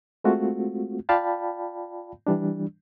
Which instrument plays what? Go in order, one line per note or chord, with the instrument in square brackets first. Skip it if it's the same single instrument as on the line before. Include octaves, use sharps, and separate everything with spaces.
[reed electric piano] G#3 A3 C4 F4 F#4
F4 D5 F5 G5 A5 B5
E3 G3 D4